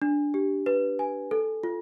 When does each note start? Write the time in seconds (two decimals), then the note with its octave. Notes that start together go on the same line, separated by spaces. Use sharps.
0.02 D4
0.34 G4
0.66 B4
0.99 G#5
1.31 A4
1.63 F4